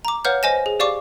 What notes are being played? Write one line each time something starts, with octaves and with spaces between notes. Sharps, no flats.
A#5 D6
B4 C#5 F5 F#5 F6 G6
C5 D#5 G#5 A#6 E7
G#4
G4 D5 F5 C#6 D6